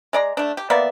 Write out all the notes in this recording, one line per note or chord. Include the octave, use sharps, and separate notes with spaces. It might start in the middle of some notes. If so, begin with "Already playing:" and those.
G#3 D5 A#5
A3 D4
G4
A#3 B3 D5 E5